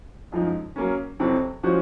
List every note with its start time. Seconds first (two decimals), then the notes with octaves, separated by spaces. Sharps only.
0.32 F#2 F3 G#3 D#4
0.76 F#3 A#3 C#4
1.20 F2 C3 F#3 C4 F#4
1.63 F3 G#3 C#4 F#4 C5